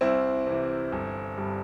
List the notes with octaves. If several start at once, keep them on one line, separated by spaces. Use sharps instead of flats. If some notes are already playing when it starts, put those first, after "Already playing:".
C2 C4 E4
C3 E3
G1
G2 G3